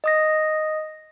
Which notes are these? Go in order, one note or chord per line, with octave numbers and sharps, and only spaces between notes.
D#5 D#6 A#6